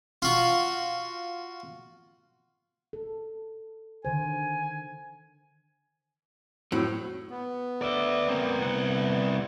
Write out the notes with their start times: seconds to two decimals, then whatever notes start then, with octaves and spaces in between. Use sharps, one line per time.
0.22 F4 F#4
2.93 A4
4.05 D3 D#3 C5 G#5
6.72 A2 F#3 C4
7.29 B3
7.82 D5 E5
8.29 A#3 C4
8.61 C2 F#5